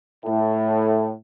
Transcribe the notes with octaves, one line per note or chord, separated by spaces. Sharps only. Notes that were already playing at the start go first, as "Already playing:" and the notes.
A2